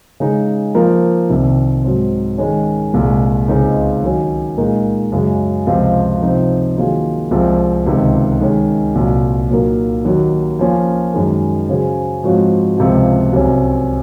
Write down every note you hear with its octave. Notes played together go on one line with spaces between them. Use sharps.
C#3 G#3 D#4
F3 A#3 F4 A#4
C2 C3 D#3
G#2 F#3 C4
D#3 G#3 C#4
C2 A#2 G#3
C#2 C#3 G#3 C4 D#4
D#3 F#3 C#4
A#2 G#3 D#4 A#4
F#2 C#3 G#3
C#2 C3 F3 C4 F4
C3 F3 C4 D#4
D#3 F#3 A#3 F4 G#4
C2 C3 F3 G#3 C4
C#2 C3 D#3
D#3 G#3 C#4
C2 A#2 F#3
A#2 F#3 A#3 D#4 A#4
D#2 D#3 F#3
F3 A#3 C#4 F4
F#2 D#3 G#3
C#3 F#3 C#4 G#4 C5
G#2 F3 C4 F#4 C#5
C#2 C3 F3
C2 C3 F#3 C#4